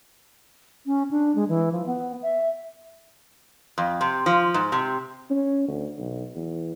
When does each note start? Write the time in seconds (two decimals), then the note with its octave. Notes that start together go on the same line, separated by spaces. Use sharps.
0.86 C#4
1.11 D4
1.35 G#3
1.49 E3
1.72 F3
1.86 B3
2.22 E5
3.78 F2
4.01 C3
4.26 F3
4.54 G#2
4.72 C3
5.30 C#4
5.68 D2
5.98 B1
6.35 E2